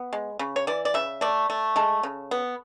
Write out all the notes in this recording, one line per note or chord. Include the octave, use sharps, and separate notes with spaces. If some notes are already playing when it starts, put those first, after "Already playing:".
Already playing: B3
G#3
C#3
C#5
E3 D5
D5
C#3 E5
A3 D5
A3
G#3 A4
C#3
B3